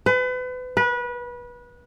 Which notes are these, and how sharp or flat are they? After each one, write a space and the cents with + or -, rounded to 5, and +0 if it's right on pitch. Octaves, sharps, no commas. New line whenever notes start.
B4 +35
B4 -25